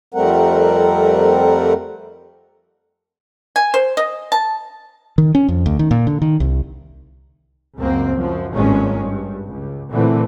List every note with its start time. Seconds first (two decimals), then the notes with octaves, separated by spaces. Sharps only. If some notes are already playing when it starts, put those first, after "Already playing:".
0.14 F2 G3 A3 C4 A#4 F#5
3.56 G#5
3.74 C5
3.97 D#5
4.32 A5
5.18 D#3
5.35 C#4
5.48 F2
5.66 D2
5.79 D#3
5.91 A#2
6.07 D3
6.22 D#3
6.40 C2
7.76 C#2 F#2 A#3 C4
8.15 F#2 F3
8.53 G#1 G2 A#2 G#3 C#4
8.98 G2
9.47 C#2
9.91 A#2 D3 E3 A3 C4